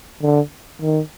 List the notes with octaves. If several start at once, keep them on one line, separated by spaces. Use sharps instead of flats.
D3
D#3